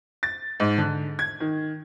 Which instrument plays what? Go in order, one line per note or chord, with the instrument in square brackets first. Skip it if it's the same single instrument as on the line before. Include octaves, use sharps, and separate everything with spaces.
[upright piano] A6
G#2
D3
G#6
D#3